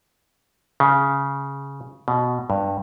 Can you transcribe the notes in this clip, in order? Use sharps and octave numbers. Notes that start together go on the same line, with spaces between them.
C#3
B2
G2